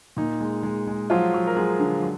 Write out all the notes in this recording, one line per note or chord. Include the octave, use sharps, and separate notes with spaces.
A#2 D#4
G#3
G#3
G#3
F3 F#3 F4
F#3
A#4
F#3 G#3 G#4
D3
F#3